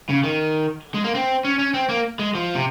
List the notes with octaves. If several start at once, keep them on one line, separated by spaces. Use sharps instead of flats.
C#3
D#3
G#3
A#3
C4
C#4
C#4
C4
A#3
G#3
F3
C3